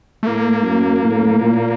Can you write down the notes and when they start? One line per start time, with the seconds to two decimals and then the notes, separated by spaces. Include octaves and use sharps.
0.23 A3
0.27 A2 A#3
0.65 F#2
1.03 A2
1.41 A#2